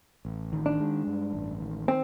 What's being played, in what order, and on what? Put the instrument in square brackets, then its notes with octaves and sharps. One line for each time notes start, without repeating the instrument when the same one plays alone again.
[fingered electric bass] A1
D#3
[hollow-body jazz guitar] D4
[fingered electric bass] G#3
G2
A1
D#3
[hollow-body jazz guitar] C4